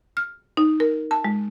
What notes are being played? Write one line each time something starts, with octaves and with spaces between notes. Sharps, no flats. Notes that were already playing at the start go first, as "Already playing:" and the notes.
F6
D#4
A#4
A5
G#3